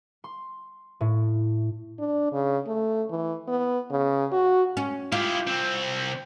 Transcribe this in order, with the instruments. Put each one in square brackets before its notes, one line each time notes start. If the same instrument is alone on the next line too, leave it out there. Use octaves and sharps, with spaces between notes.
[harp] C6
A2
[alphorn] D4
C#3
A3
E3
B3
C#3
F#4
[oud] C#4
[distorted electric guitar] E4 G4 [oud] F4
[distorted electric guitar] C2 C4